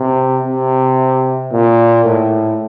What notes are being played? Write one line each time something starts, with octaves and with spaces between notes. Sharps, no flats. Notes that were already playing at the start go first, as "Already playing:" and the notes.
Already playing: C3
C3
A#2
A2